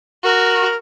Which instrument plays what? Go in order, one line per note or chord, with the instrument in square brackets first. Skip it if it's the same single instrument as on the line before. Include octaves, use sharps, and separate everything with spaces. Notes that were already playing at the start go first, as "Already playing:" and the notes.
[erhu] F#4 [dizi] A#4